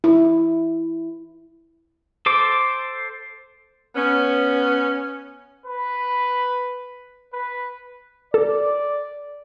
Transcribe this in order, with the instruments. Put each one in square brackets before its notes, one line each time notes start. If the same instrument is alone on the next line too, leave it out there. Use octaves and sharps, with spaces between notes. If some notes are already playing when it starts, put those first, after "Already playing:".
[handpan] E4
[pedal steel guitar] A4 C5 D6
[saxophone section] B3 C#4
[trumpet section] B4
B4
[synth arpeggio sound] A4 [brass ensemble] D5